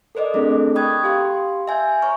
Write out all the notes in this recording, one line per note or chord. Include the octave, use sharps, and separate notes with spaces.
A4 A#4 C5 D5 D#5
A3 C4 D4 E4 G#4 A4
G5 B5 C#6 D#6 F#6 G#6
G4 F5 C6
E5 G#5 G6
C#5 A#5 C#6 F6